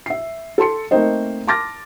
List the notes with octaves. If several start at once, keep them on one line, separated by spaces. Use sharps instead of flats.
E5 C7
A4 A5 C6 C#7
A3 A#3 C4 D#4 C5 D#5
A5 C6 D6 F6 A6 A#6